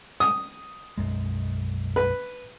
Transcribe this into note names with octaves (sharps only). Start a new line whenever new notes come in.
D#6
B1 F#2 G#3
B4